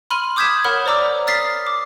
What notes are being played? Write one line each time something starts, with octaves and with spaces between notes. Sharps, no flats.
B5 C6 F6 D#7 F#7
D6 D#6 G6 G#6 B6 E7
A#4 C#5 F#5 B5 F6 F#6
C5 D5 A#5 D6 E6
D#6 F6 A6 B6 C7
D6